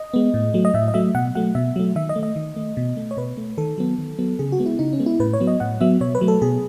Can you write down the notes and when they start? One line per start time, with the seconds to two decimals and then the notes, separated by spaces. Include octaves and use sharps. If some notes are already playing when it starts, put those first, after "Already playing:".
Already playing: D#5
0.14 G#3 B3
0.34 A2
0.54 F#3 A3
0.65 D#5
0.74 A2 E5
0.88 D#5
0.94 F#3 A3 E5
1.15 B2 F#5
1.35 F#3 A3 F#5
1.55 B2 E5
1.76 F#3 A3
1.96 D#3 E5
2.09 D#5
2.16 A3
2.23 D#5
2.36 D#3
2.56 A3
2.77 B2
2.97 A3
3.11 C#5
3.17 B2 B4
3.37 A3
3.58 D#3 A4
3.78 F#3 B3
3.98 D#3
4.19 F#3 B3
4.39 C#3 G#4
4.52 F#4
4.59 G#3 B3
4.66 E4
4.79 C#3 D#4
4.93 C#4
4.99 G#3 B3
5.06 E4
5.20 A2 B4
5.33 C#5
5.40 F#3 B3
5.47 D#5
5.60 A2 F#5
5.81 F#3 B3 E5
6.01 B2 C#5
6.15 B4
6.21 F#3 A3
6.28 A4
6.42 B2 G#4